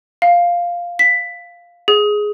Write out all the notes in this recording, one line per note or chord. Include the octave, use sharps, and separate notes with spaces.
F5
B6
G#4